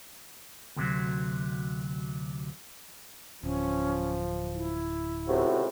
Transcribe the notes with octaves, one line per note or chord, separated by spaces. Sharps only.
D2 C3 F#3
D1 F3 C#4
E4
C#2 A2 C3 F#4